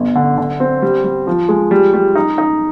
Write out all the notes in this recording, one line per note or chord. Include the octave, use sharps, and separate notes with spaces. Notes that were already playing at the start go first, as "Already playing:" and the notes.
Already playing: G1
D3
D3
C4
G3
G3
F3
G#3
G3
G3
D#4
D#4